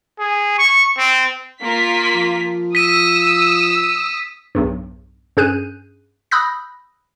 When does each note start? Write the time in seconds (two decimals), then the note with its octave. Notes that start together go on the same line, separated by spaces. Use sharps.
0.19 G#4
0.58 C#6
0.98 C4
1.62 A#3 F4 B6
2.15 F3
2.75 D#6 E6 B6 D#7
4.55 B1 E2 G2
5.37 G2 C#4 G#4 F#6 G6 D#7
6.31 B5 D#6 E6 F#6 G6 A#6